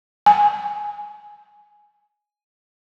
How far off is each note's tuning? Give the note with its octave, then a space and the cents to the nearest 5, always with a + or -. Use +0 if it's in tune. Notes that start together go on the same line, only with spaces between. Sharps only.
G#5 +5